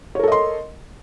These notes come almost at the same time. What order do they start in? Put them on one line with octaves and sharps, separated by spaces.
C#5 A#4 A4 D#5 C6